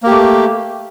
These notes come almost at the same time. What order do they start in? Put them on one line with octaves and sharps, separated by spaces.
A#3 G4 A3